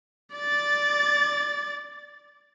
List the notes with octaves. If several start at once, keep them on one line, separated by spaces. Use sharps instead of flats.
D5 A6